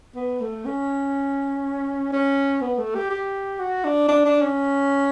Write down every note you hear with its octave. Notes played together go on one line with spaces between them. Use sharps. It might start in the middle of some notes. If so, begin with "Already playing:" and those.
B3
A3
C#4
C#4
B3
A3
G4
G4
F#4
D4
D4
D4
C#4